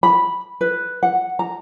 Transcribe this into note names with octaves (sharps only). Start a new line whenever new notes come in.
B5
B4
F#5
A#5